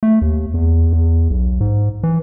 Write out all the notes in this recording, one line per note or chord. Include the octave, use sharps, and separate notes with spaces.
A3
D#2
E2
E2
B1
G#2
E3